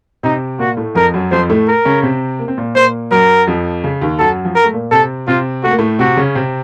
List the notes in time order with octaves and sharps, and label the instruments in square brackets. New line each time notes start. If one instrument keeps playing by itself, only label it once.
[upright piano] C3 C4 [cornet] D#4
[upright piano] A#2 A#3 [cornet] F#4
[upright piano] A2 A3
[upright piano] F2 F3 [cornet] A#4
[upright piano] F#2 F#3
[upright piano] F2 F3 [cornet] C5
[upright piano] A2 A3
[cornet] A#4
[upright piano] C#3 C#4
C3 C4
A#3
C4
A#2 A#3
[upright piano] A#2 A#3 [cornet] C5
[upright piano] F#2 F#3 [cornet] A#4
[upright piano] F2 F3
C#3
D#2 D#3
[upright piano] F#2 F#3 [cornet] A4
[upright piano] F3
[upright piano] F#3 [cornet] A#4
[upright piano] A3
A#2 A#3
[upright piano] C3 C4 [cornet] A4
[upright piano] C3 C4 [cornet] F4
[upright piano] A3 [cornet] F#4
[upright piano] A#3
A2 A3
[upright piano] C3 C4 [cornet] F#4
[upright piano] C#3 C#4
C3 C4